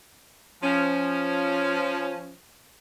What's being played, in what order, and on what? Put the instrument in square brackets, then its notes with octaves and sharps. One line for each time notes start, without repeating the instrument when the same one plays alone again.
[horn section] F3 C#4